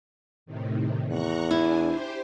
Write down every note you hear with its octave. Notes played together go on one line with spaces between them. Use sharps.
A2 C3 D#3
E2 A#5 C#6 F#6
D4 E4 G#5
G4 C5